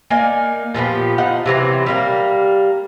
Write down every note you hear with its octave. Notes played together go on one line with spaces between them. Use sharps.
A#3 D#4 D5 G#5
A#2 F3 B3 G4
F3 D#4 F#5
C3 E3 F#3 C4
G3 A#3 A#4